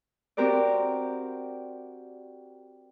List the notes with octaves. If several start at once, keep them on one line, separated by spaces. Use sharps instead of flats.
C4 F#4 G4 A#4 C5 D5